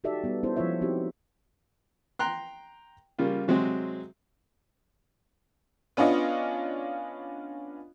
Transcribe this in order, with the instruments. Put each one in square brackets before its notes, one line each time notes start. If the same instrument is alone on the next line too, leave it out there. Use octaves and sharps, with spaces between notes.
[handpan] D#4 F#4 G4 A4 D5 E5
G3 B3
B3 C#4 E4 A4 C5
F3 G#3 E4 F4 C#5 E5
B3 C4 D#4 E4 F#4 G4
[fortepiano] G5 A#5 C6 F#6
C#3 G3 A#3 F4
C3 F#3 G#3 C4 G#4
[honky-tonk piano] B3 C#4 D4 F4 D#5